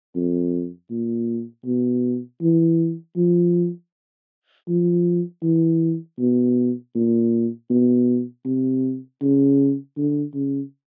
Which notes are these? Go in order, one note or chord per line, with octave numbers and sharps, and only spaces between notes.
F2
A#2
B2
E3
F3
F3
E3
B2
A#2
B2
C3
C#3
D3
C#3